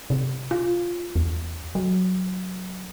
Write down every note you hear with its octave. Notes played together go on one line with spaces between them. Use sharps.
C3
F4
E2
F#3